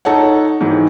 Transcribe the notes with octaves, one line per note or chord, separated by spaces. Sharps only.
D#4 A4 C#5 F#5
G#2 D#3 E3 F#3